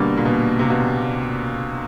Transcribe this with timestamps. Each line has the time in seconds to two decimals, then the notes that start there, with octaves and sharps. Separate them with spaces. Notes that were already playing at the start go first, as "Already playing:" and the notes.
Already playing: B2 D3 G3 A#3
0.17 A#2
0.25 B2
0.59 C3
0.70 B2